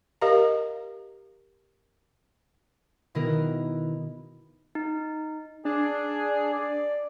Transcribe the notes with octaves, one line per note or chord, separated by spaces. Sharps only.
G4 A#4 D#5 F5 A#5
B2 D#3 B3 E4 A#4
D#4
D4 G#4
D5